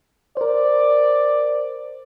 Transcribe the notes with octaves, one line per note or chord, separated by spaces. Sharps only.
A#4 C5 D5